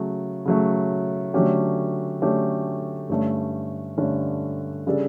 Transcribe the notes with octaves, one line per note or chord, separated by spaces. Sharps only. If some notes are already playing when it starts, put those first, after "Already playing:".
Already playing: C#3 F#3 A3
C#3 F#3 A3
D3 F#3 A3 C#4 G4
D3 F#3 A3 C#4 G4
G2 D3 A3 C#4
G2 D3 A3 C#4
C#3 G3 D4 A4